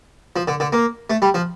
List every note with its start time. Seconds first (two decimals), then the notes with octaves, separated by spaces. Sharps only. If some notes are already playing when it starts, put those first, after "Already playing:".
0.36 F3
0.48 D3
0.60 D3
0.73 A#3
1.10 A3
1.22 G3
1.34 F3